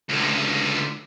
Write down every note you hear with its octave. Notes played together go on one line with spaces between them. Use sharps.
C#2 D3